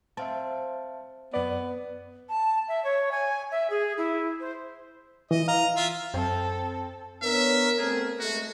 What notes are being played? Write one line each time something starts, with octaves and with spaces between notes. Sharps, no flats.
C4 E5 F5 A5
F#2 B3 D5
A5
E5
C#5
G#5
E5
G#4
E4
C5
E3 D#5
F5 A#5
F4 E5
F#2 C4 A4
B3 D4 A#4 C#5 E5
A3 B3 C4 G#4
G#3 A3 F#4